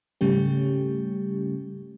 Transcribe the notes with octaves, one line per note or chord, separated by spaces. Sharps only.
G#2 C#3 G3 A3 C#4 G4